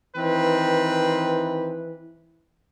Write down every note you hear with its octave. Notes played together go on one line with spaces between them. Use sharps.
D#3 E3 C4 B4